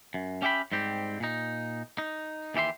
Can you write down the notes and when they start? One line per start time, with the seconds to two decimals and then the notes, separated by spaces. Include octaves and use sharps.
0.14 F#2
0.42 C#4 G4 E5 G5 B5
0.72 G#2 G3 C4 G4
1.20 A#2 D#4
1.98 D#4
2.54 D#2 E3 G4 E5 C6